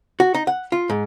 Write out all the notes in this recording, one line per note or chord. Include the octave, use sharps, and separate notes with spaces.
F#4
D#4
F#5
F4
G#2